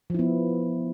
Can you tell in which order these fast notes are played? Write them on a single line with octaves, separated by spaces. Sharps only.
F3 E4 B3